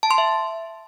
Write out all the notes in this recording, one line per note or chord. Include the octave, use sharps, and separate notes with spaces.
A5
C6
E5